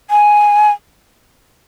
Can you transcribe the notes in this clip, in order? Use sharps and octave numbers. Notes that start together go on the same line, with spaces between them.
G#5